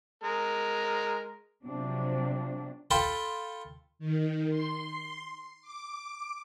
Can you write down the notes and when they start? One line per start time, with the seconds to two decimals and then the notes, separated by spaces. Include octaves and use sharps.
0.24 G#3 A#4
1.63 C3 F3 F#3 D4
2.91 F4 A4 G5 B5
3.99 D#3
4.49 C6
5.62 D6